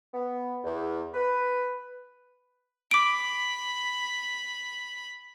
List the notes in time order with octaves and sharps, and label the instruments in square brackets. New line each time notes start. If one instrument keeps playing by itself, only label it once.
[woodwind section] B3
E2
B4
[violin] B5 [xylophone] D6 D7